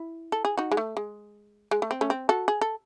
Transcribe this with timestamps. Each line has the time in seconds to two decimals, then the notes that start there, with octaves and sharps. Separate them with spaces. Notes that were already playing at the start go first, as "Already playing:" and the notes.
Already playing: E4
0.32 A4
0.45 G#4
0.57 D#4 F#4
0.72 G#3
0.77 A3
0.97 G#3
1.71 G#3
1.82 A3
1.91 C4
2.01 A3 C#4
2.10 C4
2.29 F#4 A4
2.48 G#4
2.61 A4